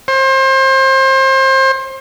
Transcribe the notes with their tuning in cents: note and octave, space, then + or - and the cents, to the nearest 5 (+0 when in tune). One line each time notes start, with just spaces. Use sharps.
C5 +30